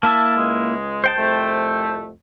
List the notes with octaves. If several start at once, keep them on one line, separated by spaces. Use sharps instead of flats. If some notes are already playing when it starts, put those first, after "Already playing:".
A#3 E4 E5 A5
C#2 G#3
C5 G5 A5
C2 F2 A3